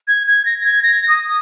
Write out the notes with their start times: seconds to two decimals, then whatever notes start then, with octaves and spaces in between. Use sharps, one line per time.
0.08 G#6
0.27 G#6
0.46 A#6
0.64 G#6
0.83 A#6
1.08 D#6